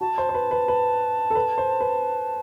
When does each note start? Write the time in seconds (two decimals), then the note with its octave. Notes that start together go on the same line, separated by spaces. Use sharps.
0.01 F#4 A5
0.18 C5
0.29 C5
0.35 B4
0.51 B4
0.68 B4
1.30 A4
1.35 B4
1.58 C5
1.81 B4